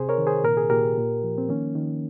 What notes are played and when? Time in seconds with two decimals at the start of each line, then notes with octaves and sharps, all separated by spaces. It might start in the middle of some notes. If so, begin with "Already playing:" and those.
Already playing: C3 G#4 C5
0.09 A#4 C#5
0.18 D#3
0.27 G#4 C5
0.44 A#2 A#4
0.57 G#4
0.70 A#2 G4 A#4
0.97 A#2
1.23 F3
1.38 C4
1.49 D#3 A#3 C#4
1.75 D#3